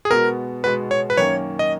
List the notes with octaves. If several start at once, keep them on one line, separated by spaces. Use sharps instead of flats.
G#4
B2 G#3 B3 F#4 A#4
B2 G#3 B3 F#4 B4
C#5
B4
F#2 D#3 A#3 C#4 C#5
D#5